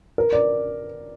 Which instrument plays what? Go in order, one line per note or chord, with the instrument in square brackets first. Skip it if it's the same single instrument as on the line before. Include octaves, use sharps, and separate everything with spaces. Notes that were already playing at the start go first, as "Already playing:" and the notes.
[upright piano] A#4
D5